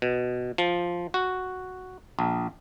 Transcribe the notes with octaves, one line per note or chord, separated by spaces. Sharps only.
B2
F3
F#4
A#1